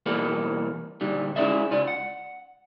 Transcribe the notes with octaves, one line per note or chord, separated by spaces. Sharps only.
B2 E3 G3 A#3 A4 B4
A#2 D3 G3
G#3 C#4 E4 G#4 D5 E5
C#2 F4 D5
F#5